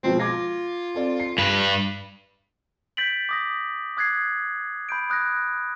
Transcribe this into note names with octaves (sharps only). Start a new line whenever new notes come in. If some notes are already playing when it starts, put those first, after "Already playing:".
B2 F3 G#3 C4
F4 D6 G#6 A#6
C4 A4 D5
C7
G2 B4
G6 A6 B6 D7 F#7
D6 D#6 A#6
D6 D#6 F#6 G#6 A6 C7
B5 G6 D7
D#6 F#6 G#6 A#6